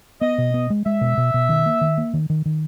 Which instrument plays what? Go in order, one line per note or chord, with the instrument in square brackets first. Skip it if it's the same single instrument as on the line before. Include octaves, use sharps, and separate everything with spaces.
[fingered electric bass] B3 [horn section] D#5
[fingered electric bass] B2
B3
G#3
[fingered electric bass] G#3 [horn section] E5
[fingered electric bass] B2
B2
B2
D#3
A#3
D#3
A#3
D#3
D#3
D#3